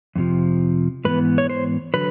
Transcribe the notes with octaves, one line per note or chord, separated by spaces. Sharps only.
F2 C3 F3
G#2 E3 B3 B4
C#5
C5
D3 F#3 B4